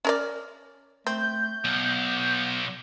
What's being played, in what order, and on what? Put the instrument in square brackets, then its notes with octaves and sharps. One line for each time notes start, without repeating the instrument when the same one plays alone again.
[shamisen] C#4 A#4 D5
[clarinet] A3 [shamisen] C4 [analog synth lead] G6
[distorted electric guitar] B1 [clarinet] B3